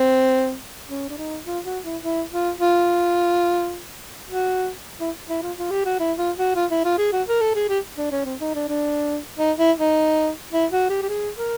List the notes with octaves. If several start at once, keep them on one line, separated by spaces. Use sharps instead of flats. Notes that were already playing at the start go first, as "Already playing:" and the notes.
Already playing: C4
C#4
D4
D#4
F4
F#4
E4
E4
F4
F4
F#4
E4
E4
F4
F4
G4
F#4
E4
F4
F#4
F4
E4
F4
G#4
F#4
A#4
A4
G#4
G4
D4
C#4
C4
D#4
D4
D4
D#4
E4
D#4
E4
F#4
G4
G4
G#4
A#4